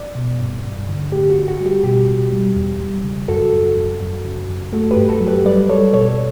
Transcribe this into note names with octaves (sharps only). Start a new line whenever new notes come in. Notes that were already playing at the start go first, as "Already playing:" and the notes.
Already playing: D5
B2
G2
G2
D3
A2 G4
F#4
A2
F#4
G3
G4
B2 G4
B2
G3
E2
G3
C#3
F#2 F#4 A4
F#2
F#2
F#2
C#3
F#2
A3 F#4 A4
G4 B4
G2
F#4 A4
F#3
G4 B4
G3 B4 D5
G3 A4 C#5
B2 A4 C#5